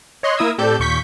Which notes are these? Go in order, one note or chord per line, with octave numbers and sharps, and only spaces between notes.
C#5 D#5 C6 F#6
A#3 E4 A#4 D#6 E6 G#6
A2 C4 G4 A4 D5 G6
D#2 A#2 C#6 G6 B6